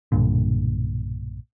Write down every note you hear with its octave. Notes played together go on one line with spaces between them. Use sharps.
B1 G2 A#2 D3